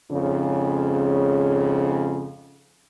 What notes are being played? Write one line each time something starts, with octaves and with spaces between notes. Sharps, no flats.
F2 G#2 C#3